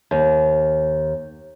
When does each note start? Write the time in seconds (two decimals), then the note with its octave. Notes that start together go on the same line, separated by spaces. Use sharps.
0.11 D#2